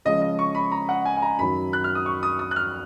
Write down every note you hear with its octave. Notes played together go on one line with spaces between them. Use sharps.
C#3 F3 G#3 C#4 D#5
D#5
C#6
B5
A#5
F#5
G#5
G#5
A#5
F#2 D#3 F#3 B5
F#6
F6
D#6
C#6
D#6
D#6
F#6
F6